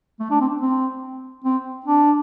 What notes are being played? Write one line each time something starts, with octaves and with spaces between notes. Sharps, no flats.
A3
D4
C4
C4
C4
D4